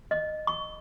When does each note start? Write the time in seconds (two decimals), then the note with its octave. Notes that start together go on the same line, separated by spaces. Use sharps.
0.11 D#5
0.47 C#6